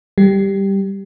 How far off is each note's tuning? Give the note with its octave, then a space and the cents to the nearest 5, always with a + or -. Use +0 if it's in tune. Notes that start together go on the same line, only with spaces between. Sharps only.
G3 +0 G4 +0